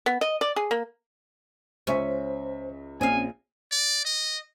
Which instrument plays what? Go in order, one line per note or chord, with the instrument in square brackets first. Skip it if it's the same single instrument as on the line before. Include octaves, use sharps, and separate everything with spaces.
[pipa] B3
D#5
D5
G#4
A#3
[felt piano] C#2 E5 B6 [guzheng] C#4 [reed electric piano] C5
[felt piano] A#1 [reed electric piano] C4 C#4 [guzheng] G#4 F5 [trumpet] G#5
[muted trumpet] D5
D#5